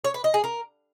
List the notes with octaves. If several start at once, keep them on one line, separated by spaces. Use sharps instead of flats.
C#5
B4
D#5
G#4
A#4